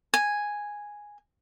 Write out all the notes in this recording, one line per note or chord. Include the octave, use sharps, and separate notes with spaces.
G#5